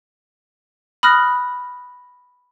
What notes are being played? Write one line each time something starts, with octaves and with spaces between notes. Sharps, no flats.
B5 D#6 F6 F#6 A#6